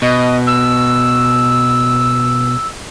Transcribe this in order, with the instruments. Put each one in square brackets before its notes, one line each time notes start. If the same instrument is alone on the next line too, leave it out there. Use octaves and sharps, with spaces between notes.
[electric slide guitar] B2 [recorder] D#5
[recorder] E6